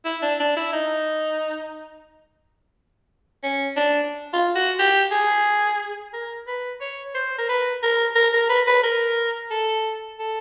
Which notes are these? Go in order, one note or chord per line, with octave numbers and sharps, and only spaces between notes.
E4
D4
D4
E4
D#4
C#4
D4
F4
F#4
G4
G#4
A#4
B4
C#5
C5
A#4
B4
A#4
A#4
A#4
B4
B4
A#4
A4
A4